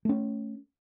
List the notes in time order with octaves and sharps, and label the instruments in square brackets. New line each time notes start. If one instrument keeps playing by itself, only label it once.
[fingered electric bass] A3 C#4